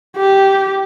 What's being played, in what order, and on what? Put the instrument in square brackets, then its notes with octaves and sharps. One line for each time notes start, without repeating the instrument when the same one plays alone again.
[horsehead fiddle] G4